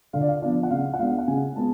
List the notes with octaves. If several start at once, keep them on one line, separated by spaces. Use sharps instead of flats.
D3 F5
D5
F5
F3 B3 D4 D5
F#5
C#3 F5
F#5
G#3 B3 D4 F5
F#5
C#3 G#5
G#3 B3 A5